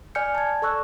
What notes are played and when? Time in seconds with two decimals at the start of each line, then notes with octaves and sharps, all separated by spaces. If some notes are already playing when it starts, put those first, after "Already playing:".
0.15 D5 G#5 F6 G6 C#7
0.35 A5 G#6
0.62 A4 D5 C#6 E6 F#6